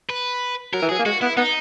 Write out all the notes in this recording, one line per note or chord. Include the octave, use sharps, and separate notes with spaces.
B4
F#3 A#4
E3
F#3 G#4
A#3
G#3 F#4
B3 E4
B3 D#4